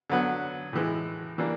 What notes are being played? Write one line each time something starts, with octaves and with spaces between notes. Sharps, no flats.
D3 F#3 B3
A2 E3 G#3
E3 G3 A#3 D4